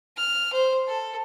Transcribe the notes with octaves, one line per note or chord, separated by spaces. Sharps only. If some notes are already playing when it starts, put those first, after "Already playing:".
F6
C5
A4